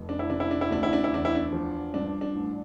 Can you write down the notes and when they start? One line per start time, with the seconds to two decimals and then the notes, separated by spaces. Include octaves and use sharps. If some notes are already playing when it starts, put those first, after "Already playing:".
Already playing: F1 F2
0.09 D4
0.19 E4
0.29 C3 D4
0.40 E4
0.51 D4
0.61 E4
0.70 D2 D4
0.83 E4
0.93 D4
1.04 E4
1.11 E2 D4
1.25 E4
1.35 D4
1.53 F3
1.94 G2 D4
2.21 D4
2.35 A1